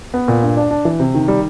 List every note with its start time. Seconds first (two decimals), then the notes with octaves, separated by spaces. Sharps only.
0.14 B3
0.28 A#2
0.42 G2
0.57 D4
0.71 D4
0.85 E3
1.00 C3
1.14 D#3
1.28 G3